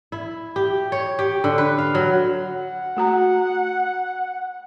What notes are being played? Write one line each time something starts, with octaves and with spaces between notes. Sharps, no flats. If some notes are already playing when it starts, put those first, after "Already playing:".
E4
G4
C#5
G4
D3
B4
F5
F#3
F#5
A3 F#4 A#5